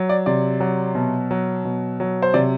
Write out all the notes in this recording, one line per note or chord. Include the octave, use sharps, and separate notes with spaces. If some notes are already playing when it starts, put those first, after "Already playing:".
Already playing: F#3
D5
C3 D5
F#3
B2
F#3
B2
F#3
C5
C3 D5